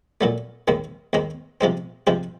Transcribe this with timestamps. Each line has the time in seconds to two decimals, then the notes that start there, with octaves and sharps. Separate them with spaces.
0.21 A#2 F#3 A3
0.68 D#2 D#3 G#3 C4
1.13 D#2 D#3 G#3 C4
1.61 C3 F3 G#3 C4
2.07 C3 F3 G#3 C4